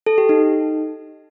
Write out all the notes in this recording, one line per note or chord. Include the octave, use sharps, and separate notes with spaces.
A4
G4
D#4